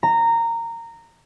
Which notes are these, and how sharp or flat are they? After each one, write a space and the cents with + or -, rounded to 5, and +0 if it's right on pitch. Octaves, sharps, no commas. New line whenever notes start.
A#5 -15